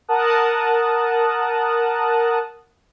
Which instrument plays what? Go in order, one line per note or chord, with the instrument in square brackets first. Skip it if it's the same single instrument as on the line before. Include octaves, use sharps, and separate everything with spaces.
[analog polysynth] A#4 F#5 A5 D#6 F#6